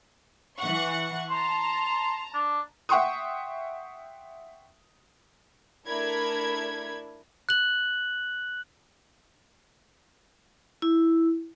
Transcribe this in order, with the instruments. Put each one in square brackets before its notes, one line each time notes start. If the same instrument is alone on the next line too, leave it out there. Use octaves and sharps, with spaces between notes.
[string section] E3 F#5 C#6
[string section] A5 A#5 [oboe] C6
[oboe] D4
[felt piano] E5 F#5 G5 C6 C#6 D#6
[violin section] A3 D4 E4 A#4 B5 G#6
[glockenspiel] F#6 F#7
[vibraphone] E4